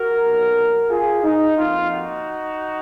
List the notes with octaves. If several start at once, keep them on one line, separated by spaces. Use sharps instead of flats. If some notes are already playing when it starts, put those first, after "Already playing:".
Already playing: F#4 A#4
B1 A#2 F#3 B3
F4 G#4
D#4
F2 F3 A#3 F4
D#4 F#4